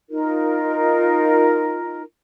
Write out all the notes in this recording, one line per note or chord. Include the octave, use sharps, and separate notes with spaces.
D#4 F4 A#4